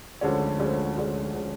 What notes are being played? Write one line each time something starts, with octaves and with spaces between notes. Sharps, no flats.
D2 D3 F3 G#3 C#4
D2 D3 F3 G#3 C#4
D2 D3 F3 G#3 C#4
D3 F3 G#3 C#4